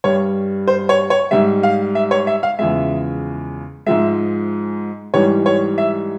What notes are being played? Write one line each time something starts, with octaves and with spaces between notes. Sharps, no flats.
G2 G3 C#5
C5
C#5
C#5
G#2 G3 E5
F5
E5
C#5
E5
F5
E2 C#3 F3 G#3 E5
G#2 F3 G#3 E5
G#2 E3 G3 C#5
C#5
E5